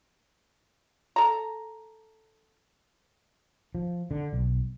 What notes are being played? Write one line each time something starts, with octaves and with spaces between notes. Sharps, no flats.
A4 A#5
F3
D3
B1